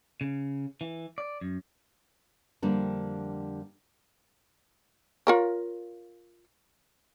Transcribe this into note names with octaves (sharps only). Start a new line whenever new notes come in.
C#3
E3
D5
F#2
F2 D3 G3 A#3 D4
F4 A#4 C#5